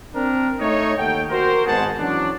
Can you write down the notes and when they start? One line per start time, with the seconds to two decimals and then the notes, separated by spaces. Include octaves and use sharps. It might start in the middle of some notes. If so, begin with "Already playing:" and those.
0.15 C4 D4 A#4
0.60 A3 D#4 C#5
0.97 D#2 A4 F#5 G5
1.30 F#4 A#4 C5
1.66 G#1 G#2 B3 G#4 F#5 A5
1.99 E3 F#3 C#4 D4